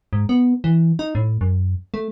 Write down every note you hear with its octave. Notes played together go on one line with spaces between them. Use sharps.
G#2
B3
E3
D#4
A2
F#2
A3